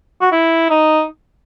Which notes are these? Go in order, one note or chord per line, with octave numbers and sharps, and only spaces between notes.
F#4
E4
D#4